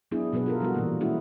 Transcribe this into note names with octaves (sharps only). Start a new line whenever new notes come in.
F#3 B3 D4 E4 G#4
B2 F#3 B3 G#4 B4
F4 A4 A#4
F3 G3 B3 F#4
A#2 E3 A#3
G#3 A#3 C#4 E4 F#4 G#4